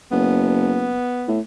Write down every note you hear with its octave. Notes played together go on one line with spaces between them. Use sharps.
F#1 B3
A2